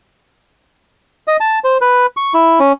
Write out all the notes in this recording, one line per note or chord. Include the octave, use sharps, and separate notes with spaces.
D#5
A5
C5
B4
C#6
E4
C#4